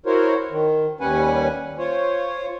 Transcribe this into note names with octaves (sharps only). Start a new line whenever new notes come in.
E4 F#4 A#4 C5 C#5
D#3
D#2 G3 C#4 B4 F#5 G#5
F4 C5 C#5